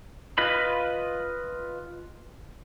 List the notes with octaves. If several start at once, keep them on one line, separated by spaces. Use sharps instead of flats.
F4 B4 D#5 B5